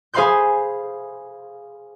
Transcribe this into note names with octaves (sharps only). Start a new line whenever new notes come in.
G#4 C5 F5 B5 C6 G6